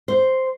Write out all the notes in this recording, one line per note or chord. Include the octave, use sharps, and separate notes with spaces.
C5